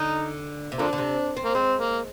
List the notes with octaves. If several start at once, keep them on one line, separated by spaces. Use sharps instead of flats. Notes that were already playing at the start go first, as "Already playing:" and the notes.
Already playing: D3 D#4
C3
D3 F3 A#3 D4
D3
C3
C4
A#3
G#3 C4
A#3